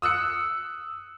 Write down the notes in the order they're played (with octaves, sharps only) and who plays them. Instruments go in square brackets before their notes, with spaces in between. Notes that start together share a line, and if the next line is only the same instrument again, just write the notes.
[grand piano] D#6 E6 F#6 C#7